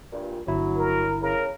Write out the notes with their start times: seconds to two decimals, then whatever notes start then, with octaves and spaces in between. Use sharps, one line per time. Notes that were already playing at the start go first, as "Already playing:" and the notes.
0.13 G2 A#2
0.47 G1 F#3 E4
0.78 A#4
1.22 C#3 A#4